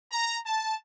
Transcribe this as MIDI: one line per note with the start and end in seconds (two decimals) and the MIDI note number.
0.12 0.37 82
0.46 0.75 81